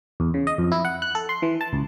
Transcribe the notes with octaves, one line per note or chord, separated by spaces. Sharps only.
E2
C#3
D#5
F2
E4
F#5
F#6
A4
C6
E3
A5
C#2